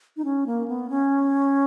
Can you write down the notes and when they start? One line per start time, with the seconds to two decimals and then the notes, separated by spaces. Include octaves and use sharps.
0.17 D#4
0.25 C#4
0.46 A#3
0.68 B3
0.90 C#4